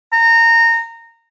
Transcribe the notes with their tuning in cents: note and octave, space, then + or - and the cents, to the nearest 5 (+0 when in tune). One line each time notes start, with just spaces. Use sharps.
A#5 -20